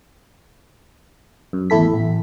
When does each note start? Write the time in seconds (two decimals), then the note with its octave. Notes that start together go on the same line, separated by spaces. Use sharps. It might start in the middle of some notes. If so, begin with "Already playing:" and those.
1.53 F#2
1.70 G#1 E2 A3 E4 A4 B6
1.94 A1